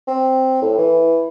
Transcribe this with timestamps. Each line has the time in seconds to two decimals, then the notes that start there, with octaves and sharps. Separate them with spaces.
0.07 C4
0.62 A2
0.78 E3